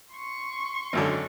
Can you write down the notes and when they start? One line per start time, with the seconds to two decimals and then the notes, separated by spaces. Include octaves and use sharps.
0.12 C6 C#6
0.93 G#1 F#2 D3